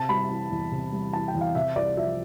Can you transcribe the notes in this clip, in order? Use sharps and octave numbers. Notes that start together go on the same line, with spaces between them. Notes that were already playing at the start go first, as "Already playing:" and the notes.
Already playing: C3 A5
G3 B5
E3
E2
C3
G3
E3 A5
G5
E2
F5
C3 E5
C2 D5
F3 E5